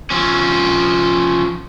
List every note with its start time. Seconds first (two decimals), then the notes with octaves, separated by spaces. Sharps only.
0.10 F3 C#4